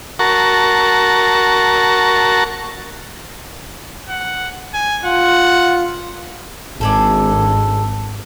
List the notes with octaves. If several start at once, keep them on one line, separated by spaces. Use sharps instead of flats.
F#4 A#4 A5 C#6
F#5
G#5
F4 F#5
G#1 D4 G#4 A4